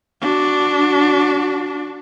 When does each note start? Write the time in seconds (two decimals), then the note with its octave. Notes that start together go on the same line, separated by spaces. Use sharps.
0.21 D4 F#4